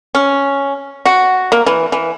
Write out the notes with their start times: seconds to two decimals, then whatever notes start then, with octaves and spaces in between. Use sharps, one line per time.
0.15 C#4
1.06 F#4
1.52 A#3
1.66 E3
1.92 E3